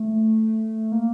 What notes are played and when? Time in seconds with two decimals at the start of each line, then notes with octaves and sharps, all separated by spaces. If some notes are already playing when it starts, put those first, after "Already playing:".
Already playing: A3
0.92 A#3